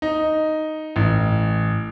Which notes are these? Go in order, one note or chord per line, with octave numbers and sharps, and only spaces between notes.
D#4
A1